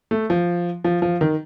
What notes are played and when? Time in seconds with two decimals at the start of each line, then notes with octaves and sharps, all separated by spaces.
0.11 A3
0.30 F3
0.84 F3
1.02 F3
1.21 D#3